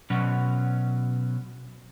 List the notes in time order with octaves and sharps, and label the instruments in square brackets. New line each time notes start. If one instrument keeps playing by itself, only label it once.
[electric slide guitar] B2 F#3 C#4